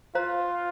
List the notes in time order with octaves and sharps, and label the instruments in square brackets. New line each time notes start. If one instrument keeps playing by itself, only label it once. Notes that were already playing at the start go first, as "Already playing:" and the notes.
[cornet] F4 [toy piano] C5 F5 A#5